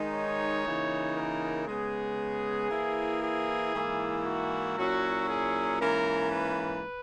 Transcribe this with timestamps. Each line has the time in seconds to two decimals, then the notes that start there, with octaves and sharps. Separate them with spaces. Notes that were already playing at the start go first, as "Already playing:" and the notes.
Already playing: D#3 G#3 D#4
0.13 C#5
0.65 C#3 E3 A#3 D#4
1.16 A#4
1.67 C#3 G#3 B3 G#4
2.70 E3 A#3 E4
3.22 G#4
3.73 G#2 E3 A#3 E4
4.25 F#4
4.77 A#2 F#3 C#4 E4 F#4
5.28 G#4
5.80 G#2 E3 A#3 C#4 A#4
6.31 B4